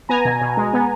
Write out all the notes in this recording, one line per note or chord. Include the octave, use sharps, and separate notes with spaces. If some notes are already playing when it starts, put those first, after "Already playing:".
B3 G#5 A#5
B2
B2
G#3
B3